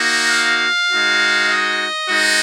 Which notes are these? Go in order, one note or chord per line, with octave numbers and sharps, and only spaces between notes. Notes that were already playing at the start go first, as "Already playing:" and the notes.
Already playing: A#3 D#4 F#4
F5
G#3 D#4 F#4
D#5
G#3 D#4 F#4